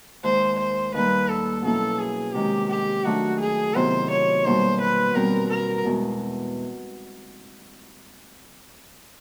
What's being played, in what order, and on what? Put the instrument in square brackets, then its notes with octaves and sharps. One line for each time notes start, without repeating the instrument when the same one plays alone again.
[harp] D#2 D#3 G#3 [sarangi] C5
[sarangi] C5
[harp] D#2 D#3 G3 A#3 [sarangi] B4
[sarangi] A4
[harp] B2 F#3 A#3 C#4 E4 [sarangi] A4
[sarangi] G#4
[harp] C3 D#3 G#3 C#4 [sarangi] G4
[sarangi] G4
[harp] D#3 F#3 A3 D4 [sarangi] F#4
[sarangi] G#4
[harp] C3 D#3 F#3 B3 E4 [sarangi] C5
[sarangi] C#5
[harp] B2 G3 A#3 D#4 [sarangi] C5
[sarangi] B4
[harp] B2 G3 C4 [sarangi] A#4
[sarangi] A#4
[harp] E2 B2 G#3